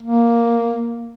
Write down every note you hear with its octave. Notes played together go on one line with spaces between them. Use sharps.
A#3